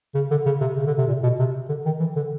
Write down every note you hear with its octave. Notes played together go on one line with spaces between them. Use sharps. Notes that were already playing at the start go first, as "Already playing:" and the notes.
C#3
D3
C#3
C3
C#3
D3
C3
A#2
B2
C3
D3
D#3
E3
D3